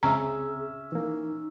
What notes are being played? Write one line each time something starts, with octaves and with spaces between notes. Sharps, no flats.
C#2 C#3 C4 C#4 G#4 E5 A#5
E3 A#3 D#4